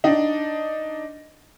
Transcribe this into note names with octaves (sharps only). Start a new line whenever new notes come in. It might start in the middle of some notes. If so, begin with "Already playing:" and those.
D4 D#4